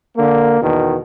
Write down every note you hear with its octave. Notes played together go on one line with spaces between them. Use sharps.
D3 A#3
E2 B2 D#3